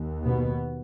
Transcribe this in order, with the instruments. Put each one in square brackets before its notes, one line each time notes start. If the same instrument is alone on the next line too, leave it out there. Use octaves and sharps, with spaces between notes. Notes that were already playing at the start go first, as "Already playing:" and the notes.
Already playing: [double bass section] D#2
B2 B3